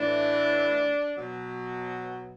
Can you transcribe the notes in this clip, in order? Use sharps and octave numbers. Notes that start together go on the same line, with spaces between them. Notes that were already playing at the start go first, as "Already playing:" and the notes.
Already playing: A2 E3 D4
B2 F#3